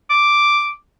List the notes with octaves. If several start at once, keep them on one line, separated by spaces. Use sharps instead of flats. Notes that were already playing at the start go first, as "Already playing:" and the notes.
D6